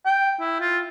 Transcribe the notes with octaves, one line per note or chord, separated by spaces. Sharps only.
G5
E4
F4